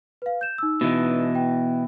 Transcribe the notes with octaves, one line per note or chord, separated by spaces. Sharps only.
B4 F5
G6 E7
D#4 E6
B2 E3
G5